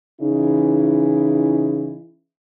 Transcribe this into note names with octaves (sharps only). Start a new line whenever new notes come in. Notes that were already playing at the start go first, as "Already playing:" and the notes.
C#3 E3 D#4 E4